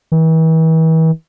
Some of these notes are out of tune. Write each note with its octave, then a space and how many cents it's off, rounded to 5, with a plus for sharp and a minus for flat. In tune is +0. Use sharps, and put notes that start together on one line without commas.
E3 -40